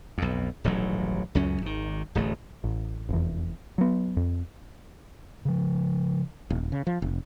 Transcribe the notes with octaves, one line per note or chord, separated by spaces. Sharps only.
B1 F2
D#1 A1 G#2 F#3
C#2 F#2 F#3 C#4
G#1 D#3
D1 A1 A3
A1
F1 E2
F#3 B3
F2
C#3 F3
D#1
C#3
F3
F1